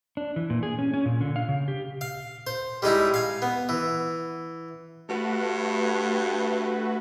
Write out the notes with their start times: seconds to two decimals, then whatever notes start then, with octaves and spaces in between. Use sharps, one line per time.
0.17 D4
0.36 E3
0.50 A#2
0.63 G#4
0.79 C#4
0.94 C#4
1.05 A#2
1.21 D3
1.36 F5
1.49 C#3
1.68 G4
2.01 F5
2.47 C5
2.82 G3 G#3 D#4 E4
3.14 F5 G#5
3.42 B3
3.69 E3
5.09 G2 A3 F#4 B4